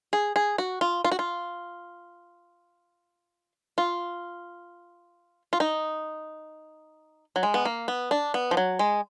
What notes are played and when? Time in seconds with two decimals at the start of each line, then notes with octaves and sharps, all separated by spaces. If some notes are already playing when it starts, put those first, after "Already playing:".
0.13 G#4
0.36 G#4
0.58 F#4
0.81 F4
1.05 F4
1.12 F#4
1.19 F4
3.78 F4
5.53 F4
5.60 D#4
7.36 F#3
7.43 G#3
7.54 B3
7.65 A#3
7.88 B3
8.11 D4
8.34 B3
8.51 F3
8.57 F#3
8.79 G#3